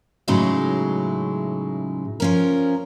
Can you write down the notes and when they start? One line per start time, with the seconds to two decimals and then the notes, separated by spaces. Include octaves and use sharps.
0.28 A2 C#3 F#3 G#3 D#4 E4
2.20 F3 C#4 A#4